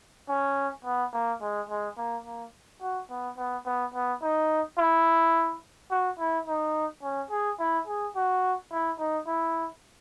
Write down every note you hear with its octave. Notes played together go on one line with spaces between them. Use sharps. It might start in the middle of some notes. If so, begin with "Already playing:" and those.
C#4
B3
A#3
G#3
G#3
A#3
A#3
F#4
B3
B3
B3
B3
D#4
E4
F#4
E4
D#4
C#4
G#4
E4
G#4
F#4
E4
D#4
E4